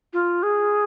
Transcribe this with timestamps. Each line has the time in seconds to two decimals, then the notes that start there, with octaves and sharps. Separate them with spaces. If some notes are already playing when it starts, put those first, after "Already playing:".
0.13 F4
0.43 G#4